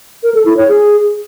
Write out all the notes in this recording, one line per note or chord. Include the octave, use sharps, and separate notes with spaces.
A#4
A4
E4
C#5
G#4